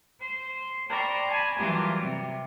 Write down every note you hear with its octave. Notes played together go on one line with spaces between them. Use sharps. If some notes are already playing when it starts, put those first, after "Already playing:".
C5
C5 D5 G5 A#5 B5 C#6
G#5 A5 B5
E3 F#3 G3 F4 G4 A#4
C3